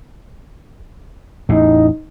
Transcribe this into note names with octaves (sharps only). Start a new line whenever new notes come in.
A1 E2 A2 D#4